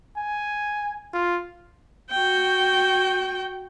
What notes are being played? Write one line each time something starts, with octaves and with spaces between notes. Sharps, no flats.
G#5
F4
F#4 G5